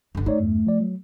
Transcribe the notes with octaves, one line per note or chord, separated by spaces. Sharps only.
G1 D3
A3 D#4 C#5 D5
E2 G2
F3 D5
F#3